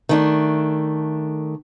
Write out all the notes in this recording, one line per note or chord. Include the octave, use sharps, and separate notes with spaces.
D#3 A3 D4